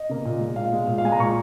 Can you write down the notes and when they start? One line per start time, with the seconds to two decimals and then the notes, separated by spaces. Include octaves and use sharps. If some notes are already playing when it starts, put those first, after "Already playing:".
Already playing: D#5
0.09 C#3 A#3
0.25 A#2
0.40 G#3
0.56 A#2 F5
0.73 G#3
0.87 A#2
0.98 F5
1.04 G#3 G#5
1.12 A#5
1.19 A#2 C#6